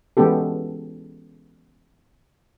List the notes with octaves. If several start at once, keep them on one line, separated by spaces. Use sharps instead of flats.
E3 G#3 B3 C#4 G4 A4